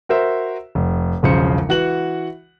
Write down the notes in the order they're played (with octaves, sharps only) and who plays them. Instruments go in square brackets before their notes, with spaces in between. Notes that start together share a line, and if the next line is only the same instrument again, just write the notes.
[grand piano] F#4 A#4 C5 E5
F1
E1 B1 C#3 F3 C5 C#7
E3 F#4 F#5 F#7